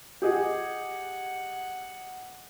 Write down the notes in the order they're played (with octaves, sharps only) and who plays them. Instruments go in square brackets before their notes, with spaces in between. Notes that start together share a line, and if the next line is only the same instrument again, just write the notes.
[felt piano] G4 G#4 D#5 [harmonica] F#5